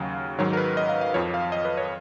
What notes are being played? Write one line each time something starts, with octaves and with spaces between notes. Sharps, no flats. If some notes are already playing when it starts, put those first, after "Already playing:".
Already playing: D#2 C#3 F#3 F5
G#2 D#3 F#3 C#5
A#4
B4
D#5
F5
F5
F2 F3 C#5
F5
D#5
B4
C#5